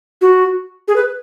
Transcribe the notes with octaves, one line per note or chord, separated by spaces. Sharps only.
F#4
G#4
B4